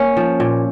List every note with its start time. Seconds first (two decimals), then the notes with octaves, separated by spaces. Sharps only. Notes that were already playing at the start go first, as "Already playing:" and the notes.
Already playing: A#3 C#4
0.17 F3
0.40 A#2